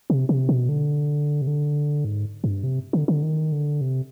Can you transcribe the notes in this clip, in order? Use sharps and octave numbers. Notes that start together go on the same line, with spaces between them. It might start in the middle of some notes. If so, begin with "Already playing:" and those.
C3
C3
B2
D3
C3
D3
G#2
G2
C3
D3
D3
D#3
D3
C3